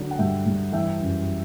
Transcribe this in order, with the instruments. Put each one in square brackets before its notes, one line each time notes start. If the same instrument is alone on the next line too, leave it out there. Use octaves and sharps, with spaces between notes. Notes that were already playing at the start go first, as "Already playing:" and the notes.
Already playing: [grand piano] D3 F#3 D5
F#5
G2 E5 G5
G2
E3 E5 G5
F#2